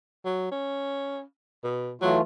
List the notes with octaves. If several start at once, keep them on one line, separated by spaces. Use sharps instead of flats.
F#3
C#4
B2
E3 F#3 A3 F4